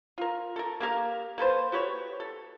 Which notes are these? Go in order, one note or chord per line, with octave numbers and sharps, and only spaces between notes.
F4 A#4
A4 A#4
A#3 G4 A#4 F5
A#3 A4 B4 C5
F#4 G4 B4 C#5
A4